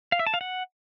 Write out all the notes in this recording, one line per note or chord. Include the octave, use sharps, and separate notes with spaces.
F5
E5
A5
F5
F#5